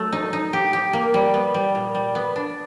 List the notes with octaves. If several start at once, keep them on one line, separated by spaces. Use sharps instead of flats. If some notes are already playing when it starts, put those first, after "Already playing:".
Already playing: F#3 A3
D#4
D#4
G4
G4
A#3
G3
B3
G3
A#2
G3
B3
D4